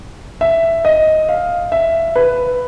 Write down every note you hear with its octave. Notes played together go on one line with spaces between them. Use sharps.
E5
D#5
F5
E5
B4